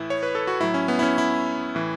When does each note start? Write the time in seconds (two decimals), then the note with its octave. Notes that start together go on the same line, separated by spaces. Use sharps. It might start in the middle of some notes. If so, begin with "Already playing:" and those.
Already playing: A2 E3 E4
0.10 C#5
0.23 B4
0.35 A4
0.47 F#4
0.60 A2 F#3 E4
0.74 C#4
0.88 B3
0.99 E4
1.03 C#4
1.18 E4
1.75 A2 E3